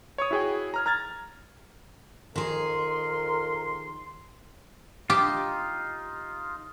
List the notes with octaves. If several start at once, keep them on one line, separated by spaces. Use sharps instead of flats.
C#5 C#6 D#6
E4 F#4 G#4 C#5 G5
A#5 F6 G#6
A#5 F6 G#6 A6
F2 D#3 G#4 A#4 C6
D#4 F4 G4